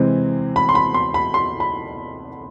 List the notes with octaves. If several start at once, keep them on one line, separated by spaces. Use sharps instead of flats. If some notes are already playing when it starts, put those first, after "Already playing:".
Already playing: C3 E3 G#3 C4
B5
C6
B5
C6
B5
C6
B5